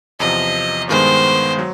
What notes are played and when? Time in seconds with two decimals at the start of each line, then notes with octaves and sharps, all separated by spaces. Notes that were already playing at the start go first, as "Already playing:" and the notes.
0.20 E2 C3 F3 D#5
0.89 G2 D#3 G#3 B3 C5
1.59 F#3